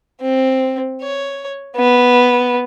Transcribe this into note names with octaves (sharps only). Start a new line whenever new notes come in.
C4
C#5
B3